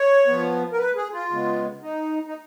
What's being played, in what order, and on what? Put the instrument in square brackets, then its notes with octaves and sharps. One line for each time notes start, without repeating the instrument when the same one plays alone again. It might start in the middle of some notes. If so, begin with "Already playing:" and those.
Already playing: [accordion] C#5
F3 B3
A#4
B4
G#4
F4
C#3 G#3 B3
D#4
D#4